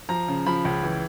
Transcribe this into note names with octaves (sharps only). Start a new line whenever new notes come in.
F3 A#5
C#3
F3 B5
C#2
E3